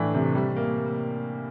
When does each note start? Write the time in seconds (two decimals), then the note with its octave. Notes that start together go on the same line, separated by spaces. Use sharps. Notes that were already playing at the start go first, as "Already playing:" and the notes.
Already playing: A2 E3 A3 D4
0.14 C3
0.35 G3
0.56 A#3